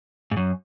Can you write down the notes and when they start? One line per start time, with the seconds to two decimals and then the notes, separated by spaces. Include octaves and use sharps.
0.31 G#2
0.37 F#2